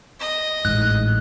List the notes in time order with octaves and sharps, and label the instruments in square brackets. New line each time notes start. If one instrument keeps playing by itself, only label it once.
[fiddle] D#5
[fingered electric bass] A1 G#2 [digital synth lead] F#6